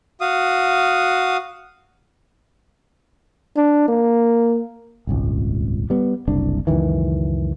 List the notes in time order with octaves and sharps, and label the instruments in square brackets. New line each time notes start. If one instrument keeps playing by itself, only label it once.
[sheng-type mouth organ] F#4 F5 D#6
[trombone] D4
A#3
[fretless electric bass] D#1 G#1 C#2
G3 B3
F#1 C2 D4
C#2 F#2 D#3 E3